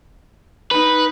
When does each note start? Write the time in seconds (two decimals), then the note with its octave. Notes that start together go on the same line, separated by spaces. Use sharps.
0.71 D#4 B4